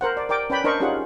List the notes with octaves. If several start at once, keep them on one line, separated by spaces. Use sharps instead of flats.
A#4 C5 F#5
D5
A#4 D5 G5 D6
C#4 B4 D5 G5 B5
D4 A#4 C5 D#5 C#6
C#4 D#4 F4 G4 G#4 F#5